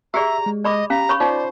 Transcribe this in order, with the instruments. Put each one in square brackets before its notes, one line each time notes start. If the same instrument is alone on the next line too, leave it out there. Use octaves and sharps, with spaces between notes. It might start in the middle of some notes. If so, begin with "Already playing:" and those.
[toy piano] G4 G#4 D5 [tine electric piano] E5 [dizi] A#5
[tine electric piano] G#3
[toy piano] D5 B5 D6 [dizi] D#5
[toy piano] C#4 F5 [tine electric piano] G4 [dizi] A#5
[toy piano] C#5 B5 C#6
[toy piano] D#4 F4 [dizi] C5 [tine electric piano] D5